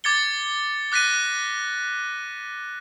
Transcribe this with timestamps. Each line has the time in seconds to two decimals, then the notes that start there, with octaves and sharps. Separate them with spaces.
0.04 D6 G#6 A6 C#7 G7
0.92 D6 F#6 A#6 B6 D#7